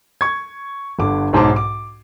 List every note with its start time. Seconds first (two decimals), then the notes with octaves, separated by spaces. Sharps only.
0.21 C#6 G#6
0.99 G1 D3 D6
1.33 B1 G#2 C5 A5 D6
1.56 D6